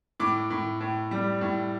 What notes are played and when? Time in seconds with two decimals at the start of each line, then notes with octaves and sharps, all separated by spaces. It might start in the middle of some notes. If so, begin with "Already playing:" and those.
0.20 A2 D6
0.50 A2
0.80 A2
1.11 G3
1.41 A2